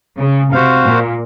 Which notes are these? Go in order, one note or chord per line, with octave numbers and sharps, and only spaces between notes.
C#3
C3 F#4 C5 F5
A#2